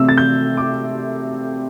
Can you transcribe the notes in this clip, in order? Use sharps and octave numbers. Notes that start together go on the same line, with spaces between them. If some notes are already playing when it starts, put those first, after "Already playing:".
Already playing: C3 A3 C4 E6
A6
G6
D6